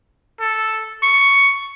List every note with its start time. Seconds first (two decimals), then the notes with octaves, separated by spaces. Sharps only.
0.40 A4
1.02 C#6